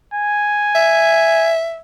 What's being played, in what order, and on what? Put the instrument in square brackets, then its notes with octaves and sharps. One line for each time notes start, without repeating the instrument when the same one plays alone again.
[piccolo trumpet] G#5
[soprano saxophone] E5